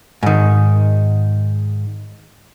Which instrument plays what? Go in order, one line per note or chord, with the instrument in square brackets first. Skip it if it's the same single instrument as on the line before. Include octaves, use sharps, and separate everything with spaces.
[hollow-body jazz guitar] G#2 D#3